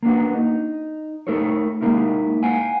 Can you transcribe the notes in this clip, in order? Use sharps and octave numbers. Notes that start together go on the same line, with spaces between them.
A#3 B3 D4 F#4
D#4
A3 D#4 A4 A#4 C#5
G#3 A#3 D#4 E4 A#4
C5 F5 F#5 G#5